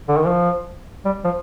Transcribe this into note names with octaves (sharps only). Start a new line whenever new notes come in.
D3
D#3
F3
G3
F3